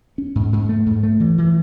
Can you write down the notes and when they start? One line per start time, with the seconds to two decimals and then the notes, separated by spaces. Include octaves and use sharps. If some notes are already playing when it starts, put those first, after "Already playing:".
0.18 C#4
0.35 G#2
0.52 G#2
0.69 A3
0.86 G#2
1.03 A3
1.20 E3
1.38 E3